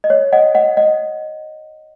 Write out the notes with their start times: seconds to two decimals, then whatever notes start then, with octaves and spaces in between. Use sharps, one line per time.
0.04 D#5
0.10 C#5
0.33 D#5 F#5
0.55 D#5 F#5
0.77 D#5 F#5